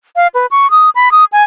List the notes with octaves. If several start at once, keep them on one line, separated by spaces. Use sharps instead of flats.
F5
B4
C#6
D#6
B5
D#6
G#5